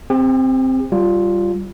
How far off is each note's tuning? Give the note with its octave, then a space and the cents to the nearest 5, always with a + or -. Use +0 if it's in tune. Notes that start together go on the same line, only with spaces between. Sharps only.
C4 +0 G4 +45
G3 -15 F4 +0